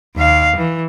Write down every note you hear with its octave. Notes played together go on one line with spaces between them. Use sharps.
D#2 F5
E3